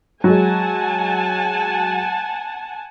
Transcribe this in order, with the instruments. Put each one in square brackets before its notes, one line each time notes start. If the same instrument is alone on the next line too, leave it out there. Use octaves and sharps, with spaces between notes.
[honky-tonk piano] F#3 G#3 [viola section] F#5 G#5 A5